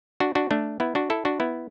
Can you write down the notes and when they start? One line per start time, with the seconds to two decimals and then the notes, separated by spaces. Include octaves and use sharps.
0.20 D4 F#4
0.35 D4 F#4
0.51 A3 D4
0.80 B3 E4
0.95 D4 F#4
1.10 E4 A4
1.25 D4 F#4
1.40 B3 E4